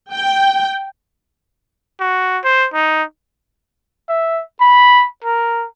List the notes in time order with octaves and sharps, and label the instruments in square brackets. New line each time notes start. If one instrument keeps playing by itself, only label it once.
[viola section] G5
[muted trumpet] F#4
C5
D#4
[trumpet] E5
B5
A#4